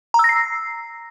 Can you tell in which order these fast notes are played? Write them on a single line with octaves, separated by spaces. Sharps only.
A#5 E6 A#6 C7